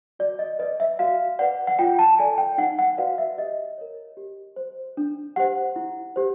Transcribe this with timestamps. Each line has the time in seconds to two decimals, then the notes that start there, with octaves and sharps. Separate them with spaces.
0.19 F#4 D5
0.39 D#5
0.59 B4 D5 D#5
0.80 E5
0.99 F#4 F5
1.39 B4 D5 F#5
1.67 F#5
1.79 F4 G5
1.99 A5
2.19 A4 D5 G#5
2.38 G5
2.58 D#4 F#5
2.79 F#5
2.97 F#4 B4 D5 F5
3.18 E5
3.38 G4 D#5
3.78 A#4 C#5
4.17 G4
4.56 C5
4.97 D4
5.36 G4 C5 F#5
5.76 E4
6.16 G4 C5